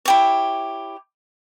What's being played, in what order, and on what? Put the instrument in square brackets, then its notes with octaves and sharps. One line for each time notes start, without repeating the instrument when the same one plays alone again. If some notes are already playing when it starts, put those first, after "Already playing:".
[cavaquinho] E4 G4 C#5